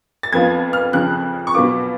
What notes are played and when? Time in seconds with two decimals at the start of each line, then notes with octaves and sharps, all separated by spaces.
0.23 A6
0.32 F2 F3 B3 F4 G#6
0.73 F6
0.93 F2 C#3 F3 F#6
1.47 C#6
1.55 B2 F#3 B3 F4 D6